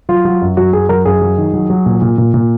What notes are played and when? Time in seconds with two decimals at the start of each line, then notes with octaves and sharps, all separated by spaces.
0.09 F#3 F4
0.25 F#3
0.42 F#2
0.57 F#3 F#4
0.73 F#2 G#4
0.89 F#3 A#4
1.05 F#2 G#4
1.22 F#3
1.38 D#3
1.53 F#3
1.70 F#3
1.86 A#2
2.02 A#2
2.18 A#2
2.34 A#2